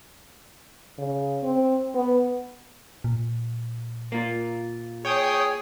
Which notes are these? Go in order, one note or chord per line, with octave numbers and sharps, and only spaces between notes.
C#3
C4
B3
A#2
A#3 F4
G#4 C#5 G5 D#6